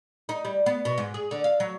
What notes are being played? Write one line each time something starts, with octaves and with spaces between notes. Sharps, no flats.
D#4
G3
B3
B2
G#2
G#4
D3
F5
F#3